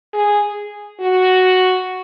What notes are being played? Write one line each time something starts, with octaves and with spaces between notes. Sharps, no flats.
G#4
F#4